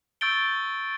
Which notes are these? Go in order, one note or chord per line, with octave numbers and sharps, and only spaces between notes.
C#6 E6 G6 A6 D7 G7